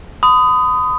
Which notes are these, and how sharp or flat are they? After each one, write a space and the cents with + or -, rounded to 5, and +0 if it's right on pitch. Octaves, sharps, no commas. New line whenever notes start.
B5 +40 D#6 +0